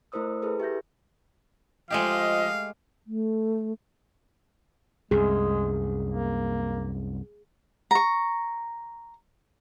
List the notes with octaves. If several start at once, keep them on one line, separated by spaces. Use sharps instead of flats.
A3 E4 A#4 C5 D#6 E6
E4 G#4 A4 B4
G4 E5 G6 A#6
F3 G#3 A3 G4 D#5 F5
A3
C2 F#2 G#3 G#4
A#3
A#5 C#6